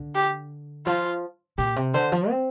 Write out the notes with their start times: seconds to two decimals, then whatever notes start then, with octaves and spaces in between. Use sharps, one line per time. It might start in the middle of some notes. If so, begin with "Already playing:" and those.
Already playing: D3
0.15 G4
0.86 F3 F4
1.58 A#2 G4
1.76 C3
1.94 D3 C5
2.12 F3
2.30 C4